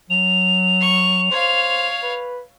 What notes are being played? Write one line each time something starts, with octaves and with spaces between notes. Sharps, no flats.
F#3 F7
C#6
C5 C#5 F5
B4